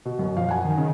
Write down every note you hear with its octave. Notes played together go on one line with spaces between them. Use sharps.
B2
F#2 B2
F3 F5
F#2 F#5 G#5
D#3
C#3